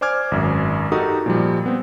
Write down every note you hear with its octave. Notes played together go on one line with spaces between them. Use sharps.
C5 D5 G#5 D6 F6 G#6
G#1 F#2
D#4 F#4 G4 A4 A#4 D#6
A#2 F3 G3
B3 C4